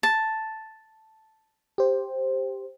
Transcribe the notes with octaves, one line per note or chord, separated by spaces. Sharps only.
A5
G4 C5